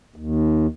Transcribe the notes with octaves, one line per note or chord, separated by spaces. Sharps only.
D#2